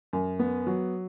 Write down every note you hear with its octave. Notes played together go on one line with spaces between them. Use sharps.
F#2
B3
F#3